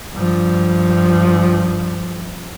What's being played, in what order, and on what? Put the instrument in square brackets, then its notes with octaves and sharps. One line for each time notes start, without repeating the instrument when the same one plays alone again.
[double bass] G2 F3